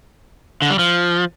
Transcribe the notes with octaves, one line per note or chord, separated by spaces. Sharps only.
D3
G3
F3